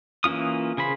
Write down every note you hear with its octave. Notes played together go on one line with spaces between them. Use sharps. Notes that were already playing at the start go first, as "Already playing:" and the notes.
E3 A#3 C#4 F4 D#6
C#3 G#4 C5 B5